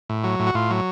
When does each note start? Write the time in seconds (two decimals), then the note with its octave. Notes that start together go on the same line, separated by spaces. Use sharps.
0.10 A2
0.24 F#3
0.40 A2
0.47 F#4
0.54 A2 F4
0.70 F#3